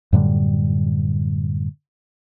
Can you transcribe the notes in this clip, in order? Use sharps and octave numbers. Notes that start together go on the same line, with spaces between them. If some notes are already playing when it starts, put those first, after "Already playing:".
F#2 A2 D3 G3